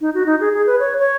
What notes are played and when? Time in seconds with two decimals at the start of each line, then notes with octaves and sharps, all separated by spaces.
0.01 D#4
0.14 F#4
0.26 D#4
0.40 G#4
0.53 G#4
0.67 B4
0.80 C#5
0.99 C#5